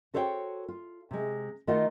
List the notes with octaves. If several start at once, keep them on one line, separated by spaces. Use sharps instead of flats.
F#4 A4 C5 C#5 F5 G5
F4
C3 G#3
D#3 A3 F4 A#4 D#5 F#5